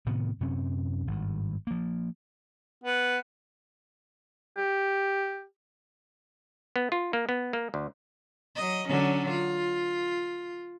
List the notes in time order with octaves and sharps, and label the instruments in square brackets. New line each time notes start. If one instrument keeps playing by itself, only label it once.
[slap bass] A2 C3 D#3 B3
F#2 C3 C4 C#4
G#1 G2
F3 A#3
[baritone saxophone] B3
[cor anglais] G4
[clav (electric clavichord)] B3
F4
A#3
B3
A#3
D2
[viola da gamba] F#3 D#5
D3 F#3 C#4
F4